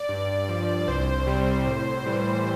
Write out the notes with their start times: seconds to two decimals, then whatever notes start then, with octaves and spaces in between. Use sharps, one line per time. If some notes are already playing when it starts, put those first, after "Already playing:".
Already playing: D5
0.09 G2
0.49 F3
0.78 D5
0.88 C2 C5
1.27 C3 G3
1.66 A2
2.06 E3 G3